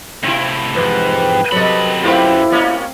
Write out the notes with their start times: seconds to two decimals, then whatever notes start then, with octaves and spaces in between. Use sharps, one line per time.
0.23 A2 C3 C4 E4
0.75 C2 F2 G#2 C3 E3 B4
1.52 F#2 C3 F#3 A4 D#5 B5
2.03 A3 C4 E4 F4 G4 B4
2.51 A#2 A#3 C#4